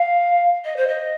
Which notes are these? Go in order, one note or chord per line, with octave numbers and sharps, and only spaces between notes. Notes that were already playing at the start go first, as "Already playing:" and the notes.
Already playing: F5
D#5
C5
D#5